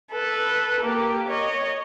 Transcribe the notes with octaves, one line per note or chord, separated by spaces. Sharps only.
A4 B4
A#3 G4
C#5 D#5